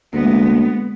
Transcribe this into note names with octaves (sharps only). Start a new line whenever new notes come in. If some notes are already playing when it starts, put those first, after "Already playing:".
D2 G#3 A#3 B3